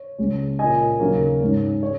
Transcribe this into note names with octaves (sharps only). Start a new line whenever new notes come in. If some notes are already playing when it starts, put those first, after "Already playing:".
Already playing: C#5
C#2 C#3 G#3 C#4
A#2 A#3 C#4 D#5 G#5
D#2 C#3 F#3 A#3
G#2 G#3 C#4
C#4 C#5